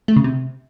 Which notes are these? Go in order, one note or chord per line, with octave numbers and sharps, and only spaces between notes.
A3
C#3
C3